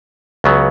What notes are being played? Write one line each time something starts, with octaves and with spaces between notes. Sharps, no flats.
C#2 C#3 F#3 B3